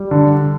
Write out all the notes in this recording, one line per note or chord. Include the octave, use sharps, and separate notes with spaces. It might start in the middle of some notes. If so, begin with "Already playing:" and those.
Already playing: G3
D3